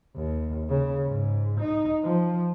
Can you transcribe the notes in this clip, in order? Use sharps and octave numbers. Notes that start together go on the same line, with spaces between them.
D#2
C#3
G#2
D#4
F3